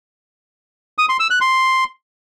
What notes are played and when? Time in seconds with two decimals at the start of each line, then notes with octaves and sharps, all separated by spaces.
0.98 D#6
1.09 C6
1.20 E6
1.30 F#6
1.41 C6